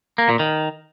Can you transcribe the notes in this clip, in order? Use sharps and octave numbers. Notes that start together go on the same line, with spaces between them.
A#3
A#2
D#3